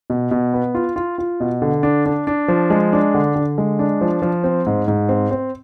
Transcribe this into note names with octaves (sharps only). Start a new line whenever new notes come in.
B2
B2
B3
F4
F4
F4
B2
D3
D4
D4
D4
F3
G#3
D4
D3
D3
G#3
D4
F3
F3
C4
G#2
G#2
C4
C4